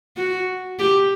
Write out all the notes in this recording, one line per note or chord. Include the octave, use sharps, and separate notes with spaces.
F#4
G4